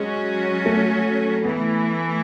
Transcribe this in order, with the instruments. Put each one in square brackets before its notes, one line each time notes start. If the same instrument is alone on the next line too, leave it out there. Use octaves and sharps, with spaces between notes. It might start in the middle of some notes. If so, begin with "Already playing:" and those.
Already playing: [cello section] F#3 C#4 F#4 [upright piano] G#3
[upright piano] A3
[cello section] E3 A3 E4 [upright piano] B3